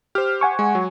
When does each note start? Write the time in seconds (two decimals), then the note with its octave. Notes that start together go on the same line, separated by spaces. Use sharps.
0.15 G4 C5 F6
0.41 F#5 G#5 C#6
0.59 G#3
0.75 F#3